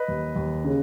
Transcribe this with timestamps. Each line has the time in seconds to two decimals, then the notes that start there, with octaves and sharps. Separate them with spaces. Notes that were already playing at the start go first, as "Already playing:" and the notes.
Already playing: B4 D#5
0.08 D#2
0.36 D#2
0.65 C#3